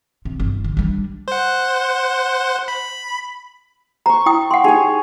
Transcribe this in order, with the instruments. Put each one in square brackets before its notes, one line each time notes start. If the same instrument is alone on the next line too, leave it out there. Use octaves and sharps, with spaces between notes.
[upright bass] C3
G1
D3
G3 D4
[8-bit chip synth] C5 F#5
B5
[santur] C5 C#6 [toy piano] A#5
[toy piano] E4 G5 D#6
[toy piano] F#5 C6 [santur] G5
[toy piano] D#4 G4 [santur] G#4 C#5